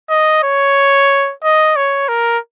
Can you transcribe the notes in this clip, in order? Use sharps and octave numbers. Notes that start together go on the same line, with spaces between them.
D#5
C#5
D#5
C#5
A#4